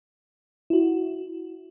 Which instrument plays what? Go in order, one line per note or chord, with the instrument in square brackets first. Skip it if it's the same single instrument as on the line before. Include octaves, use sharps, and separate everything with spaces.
[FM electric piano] E4 F#4